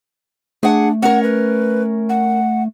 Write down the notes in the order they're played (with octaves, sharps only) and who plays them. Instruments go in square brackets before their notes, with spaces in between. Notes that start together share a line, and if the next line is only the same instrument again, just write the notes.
[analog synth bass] A3 [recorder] D4 [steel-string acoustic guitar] G#4 F#5
[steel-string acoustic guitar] C#4 A#4 [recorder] F#5
[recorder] B4
F#5